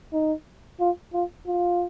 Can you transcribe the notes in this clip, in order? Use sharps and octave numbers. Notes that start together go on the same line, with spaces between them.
D#4
F4
F4
F4